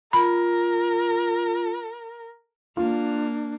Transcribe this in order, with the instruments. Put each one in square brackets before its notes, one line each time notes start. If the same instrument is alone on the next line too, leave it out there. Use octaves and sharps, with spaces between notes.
[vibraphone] F4 [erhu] A#4 [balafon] B5
[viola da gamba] A#3 [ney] D4 [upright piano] F4